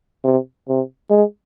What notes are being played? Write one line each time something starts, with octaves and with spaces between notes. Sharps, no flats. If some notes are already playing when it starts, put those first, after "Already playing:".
C3
C3
G#3